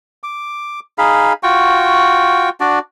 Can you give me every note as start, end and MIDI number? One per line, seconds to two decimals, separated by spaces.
0.23 0.80 86
0.98 1.33 63
0.98 1.33 68
0.98 1.33 77
0.98 1.33 83
1.43 2.50 65
1.43 2.50 66
1.43 2.50 79
1.43 2.50 85
2.60 2.79 62
2.60 2.79 66
2.60 2.79 74